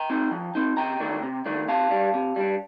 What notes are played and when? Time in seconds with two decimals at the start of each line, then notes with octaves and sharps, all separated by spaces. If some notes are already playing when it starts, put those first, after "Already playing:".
Already playing: G5 A#5
0.10 C4 D#4
0.31 F3
0.55 C4 D#4
0.77 C3 G5 A#5
1.00 D#3 A3 D4
1.22 C3
1.46 D#3 A3 D4
1.68 C3 F5 A5
1.90 G3 D4
2.14 C3
2.36 G3 D4